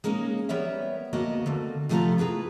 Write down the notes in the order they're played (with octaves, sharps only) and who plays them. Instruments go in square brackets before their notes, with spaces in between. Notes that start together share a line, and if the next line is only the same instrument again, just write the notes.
[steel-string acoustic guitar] G#3 A#3 C#4 D#4
G3 B3 A#4 C#5 E5
D2 A#3 B3 F#4 D#5
D3 A3 A#3
C3 F3 A3 B3 F4 A#5
E4 G#4 B4 A#5